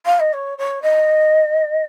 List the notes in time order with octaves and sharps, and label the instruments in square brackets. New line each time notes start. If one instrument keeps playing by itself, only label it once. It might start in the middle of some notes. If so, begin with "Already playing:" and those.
[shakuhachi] F5
D#5
C#5
C#5
D#5